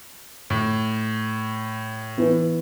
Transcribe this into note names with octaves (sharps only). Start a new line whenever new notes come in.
A2
E3 B3 E4 B4